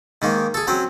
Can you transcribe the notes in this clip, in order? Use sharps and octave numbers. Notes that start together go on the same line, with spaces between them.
G#2 D#3 A#3
G#4 A4
F#3 C4 C#4